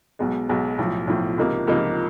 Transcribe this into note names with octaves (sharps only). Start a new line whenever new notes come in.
B1 B2 G#3
B1 B2 G#3
B1 A2 F3
B1 A2 F3
C#2 C3 F3 A#3 D#4
C#2 C3 F3 A#3 D#4